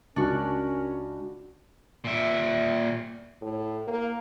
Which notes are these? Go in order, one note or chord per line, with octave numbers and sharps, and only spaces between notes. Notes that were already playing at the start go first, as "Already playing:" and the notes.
C#2 C#4 D4 F#4 A#4
A#2 E5
A2
A#3